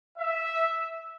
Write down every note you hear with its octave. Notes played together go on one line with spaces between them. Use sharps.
E5